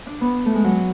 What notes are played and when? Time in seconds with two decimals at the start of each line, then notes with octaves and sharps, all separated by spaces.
0.07 D4
0.21 B3
0.46 A3
0.55 G#3
0.64 F#3